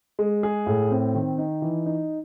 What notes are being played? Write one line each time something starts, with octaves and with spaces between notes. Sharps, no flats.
G#3
G#4
A2
C4
D#3
D#4
E3
D#4